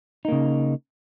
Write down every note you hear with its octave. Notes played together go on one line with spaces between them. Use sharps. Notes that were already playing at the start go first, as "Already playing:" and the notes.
C#3 A#3 D#4